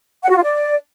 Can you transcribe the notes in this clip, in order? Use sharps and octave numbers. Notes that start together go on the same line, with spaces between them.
F#5
F#4
F4
D5